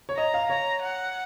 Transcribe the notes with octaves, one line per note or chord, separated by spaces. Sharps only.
C#5
D#5 A#5
F5
C#5 A#5
F#5